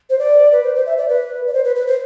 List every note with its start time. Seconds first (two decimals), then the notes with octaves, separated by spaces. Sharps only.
0.10 C5
0.19 D5
0.52 B4
0.64 C5
0.75 C5
0.86 E5
0.98 D5
1.09 B4
1.47 D5
1.54 C5
1.65 B4
1.76 B4
1.87 C5